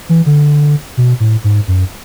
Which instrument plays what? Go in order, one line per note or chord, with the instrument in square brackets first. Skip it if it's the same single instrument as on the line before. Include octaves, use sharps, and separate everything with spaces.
[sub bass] E3
D3
B2
A2
G#2
F#2